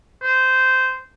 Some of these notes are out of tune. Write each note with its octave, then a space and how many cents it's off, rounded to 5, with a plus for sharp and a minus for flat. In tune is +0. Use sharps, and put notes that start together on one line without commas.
C5 -15